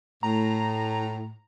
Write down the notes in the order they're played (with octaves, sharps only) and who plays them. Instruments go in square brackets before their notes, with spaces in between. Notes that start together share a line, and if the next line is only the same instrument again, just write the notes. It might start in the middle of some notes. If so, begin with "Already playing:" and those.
[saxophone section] A2 [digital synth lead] A#5